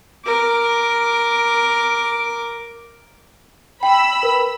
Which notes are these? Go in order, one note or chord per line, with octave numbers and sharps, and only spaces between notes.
A#4 D6
G5 B5 E6
A#4 B4